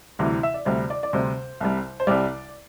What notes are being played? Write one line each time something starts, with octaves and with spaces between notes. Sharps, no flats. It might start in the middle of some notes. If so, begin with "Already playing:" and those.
D2 C3 E3 G3
E5
D5
D2 C3 G3 C5
D5
D5
D2 C3 G3 C5
C2 C3 G3
C5
C2 C3 G3 D5